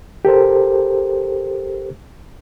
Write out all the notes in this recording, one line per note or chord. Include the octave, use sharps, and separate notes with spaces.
G4 A4 A#4 C5